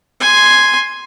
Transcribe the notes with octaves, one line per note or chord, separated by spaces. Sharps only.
G#5 C6